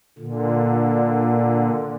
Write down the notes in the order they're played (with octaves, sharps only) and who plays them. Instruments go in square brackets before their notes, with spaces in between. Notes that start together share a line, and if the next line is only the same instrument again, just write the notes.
[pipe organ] A#2 D3